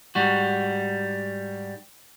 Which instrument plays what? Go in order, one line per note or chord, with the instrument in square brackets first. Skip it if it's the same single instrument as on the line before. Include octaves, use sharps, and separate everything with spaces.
[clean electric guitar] G#2 G3 F#4